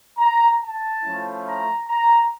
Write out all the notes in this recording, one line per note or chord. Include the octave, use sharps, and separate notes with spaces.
A#5
A5
F3 A3 C#4 E4
A#5
A#5